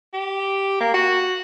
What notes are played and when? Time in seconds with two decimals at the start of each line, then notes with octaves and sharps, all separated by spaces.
0.14 G4
0.80 A#3
0.94 F#4